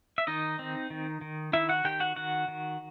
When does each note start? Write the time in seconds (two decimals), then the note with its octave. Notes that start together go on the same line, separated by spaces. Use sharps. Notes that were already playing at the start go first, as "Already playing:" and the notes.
0.18 E5
0.27 D#3 D#4 D#5
0.59 C4
0.90 D#3
1.21 D#3
1.53 D#3 E4 E5
1.69 F#4 F#5
1.84 D#3 G4 G5
2.00 F#4 F#5
2.16 D#3 F#4 F#5
2.48 D#3